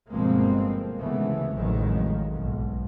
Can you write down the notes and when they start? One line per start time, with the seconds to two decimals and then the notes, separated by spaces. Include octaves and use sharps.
0.12 G1 B2 F3 G#3 A#3 C4
0.99 C#2 C3 E3 A3 B3
1.56 A1 F2 D#3 F#3 G#3
2.33 B1 G#2